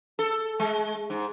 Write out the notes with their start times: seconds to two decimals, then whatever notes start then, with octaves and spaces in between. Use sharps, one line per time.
0.19 A4
0.60 G#3
1.10 G#2